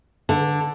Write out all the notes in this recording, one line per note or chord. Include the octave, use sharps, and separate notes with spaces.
D3